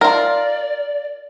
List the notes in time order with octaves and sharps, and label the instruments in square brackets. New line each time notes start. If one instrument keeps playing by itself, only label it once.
[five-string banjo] F4 A#4 [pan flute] D5